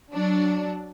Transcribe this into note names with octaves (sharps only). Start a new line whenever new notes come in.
F#3 D4